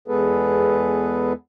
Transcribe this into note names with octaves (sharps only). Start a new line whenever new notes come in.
E2 G#3 B3 G#4 A4 B4